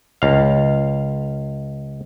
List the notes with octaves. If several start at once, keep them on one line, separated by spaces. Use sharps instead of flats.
C#2 F5